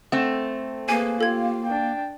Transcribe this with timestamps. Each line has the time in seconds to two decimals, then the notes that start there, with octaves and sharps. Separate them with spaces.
0.12 A3 C4 F#5
0.89 A#3 G#4 B4 G#5
1.21 F4 G4 A4 G#6
1.65 D4 G5